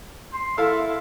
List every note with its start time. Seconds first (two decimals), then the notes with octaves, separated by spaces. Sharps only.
0.33 C6
0.58 E4 A4 E5 F5